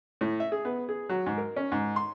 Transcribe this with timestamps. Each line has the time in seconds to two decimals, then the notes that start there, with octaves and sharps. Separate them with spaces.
0.21 A2
0.40 E5
0.52 G#4
0.65 B3
0.89 G#4
1.09 F#3
1.26 G#2
1.38 A#4
1.56 C#4
1.72 G#2
1.96 C6